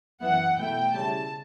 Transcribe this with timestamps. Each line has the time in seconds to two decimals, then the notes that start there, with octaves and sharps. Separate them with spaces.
0.21 F#2 E3 B3 E4 F#5
0.56 B2 A3 E4 G5
0.93 C#3 G3 C#4 E4 A5